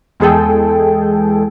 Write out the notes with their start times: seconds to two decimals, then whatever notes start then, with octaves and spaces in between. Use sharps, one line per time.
0.20 E2 G#3 G#4 A4 G5